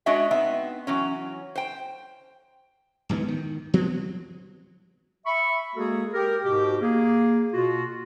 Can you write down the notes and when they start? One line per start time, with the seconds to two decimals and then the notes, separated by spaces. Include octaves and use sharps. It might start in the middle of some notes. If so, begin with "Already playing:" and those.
0.06 G#3 D4 F#4 C#5 D#5 E5
0.31 B3 C4 D#4 E5
0.87 E3 F#3 C#4
1.55 C5 G5
3.09 D1 G#2 E3 B3
3.28 D#3
3.74 F3 F#3 B3 C4
5.26 E5 B5 C#6
5.75 G#3 A#3 F#4 G#4 A4
6.13 G4 A#4
6.44 G#2 B2 G4
6.80 A#3 G#4
7.53 B2 F4 F#4